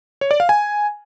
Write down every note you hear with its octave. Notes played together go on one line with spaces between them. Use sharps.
C#5
D5
F5
G#5